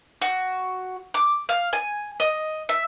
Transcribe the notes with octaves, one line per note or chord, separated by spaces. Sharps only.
F#4
D6
F5
G#5
D#5
E5